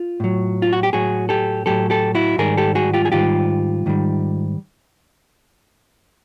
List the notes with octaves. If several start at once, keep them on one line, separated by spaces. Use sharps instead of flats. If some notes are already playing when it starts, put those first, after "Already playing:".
Already playing: F4
A2 F#3
F4
F#4
G4
A2 F#3 F#4 G#4
G4 A4
A2 F#3 G4 A4
G4 A4
E4 F#4
G#2 D#3 G3 G#4 A#4
G4 A4
F#4 G#4
F4 G4
G#4
G#2 D#3 G3 F4 G4
G#2 D#3 G3